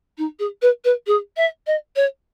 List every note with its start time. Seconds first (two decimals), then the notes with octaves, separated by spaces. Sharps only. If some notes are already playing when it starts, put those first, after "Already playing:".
0.18 D#4
0.39 G#4
0.62 B4
0.84 B4
1.07 G#4
1.36 E5
1.66 D#5
1.96 C#5